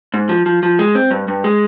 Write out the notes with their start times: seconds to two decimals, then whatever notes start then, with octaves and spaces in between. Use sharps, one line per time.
0.14 G#2
0.29 F3
0.46 F3
0.63 F3
0.79 G#3
0.95 C4
1.11 G2
1.28 G2
1.44 G#3